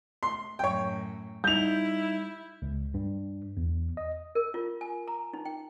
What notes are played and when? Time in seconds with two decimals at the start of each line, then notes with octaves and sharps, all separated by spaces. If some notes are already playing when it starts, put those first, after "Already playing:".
0.23 C6
0.59 F#2 A2 C#5 G5
1.44 G3 D#4 E4 G6 F7
2.62 C#2
2.94 G2
3.57 E2
3.97 D#5
4.35 A#4
4.54 F4
4.81 G#5
5.08 A#5
5.33 D#4
5.45 G5